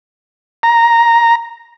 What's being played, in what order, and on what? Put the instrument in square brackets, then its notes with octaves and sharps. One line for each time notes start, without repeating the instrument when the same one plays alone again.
[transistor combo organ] A#5